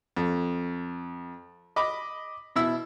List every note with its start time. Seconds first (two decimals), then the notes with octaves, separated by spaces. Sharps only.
0.17 F2
1.76 D#5 B5 D6
2.56 B2 E4 E6